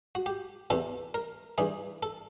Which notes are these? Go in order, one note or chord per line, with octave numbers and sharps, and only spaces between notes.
F#4
G4
E2 C3 E3 A4
A#4
G2 E3 G#4
A4